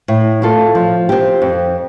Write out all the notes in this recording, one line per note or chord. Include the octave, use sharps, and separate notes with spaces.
A2
A3 F4 A4
F3
C4 G4
F2